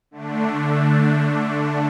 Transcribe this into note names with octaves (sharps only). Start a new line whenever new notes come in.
D3 A3 D4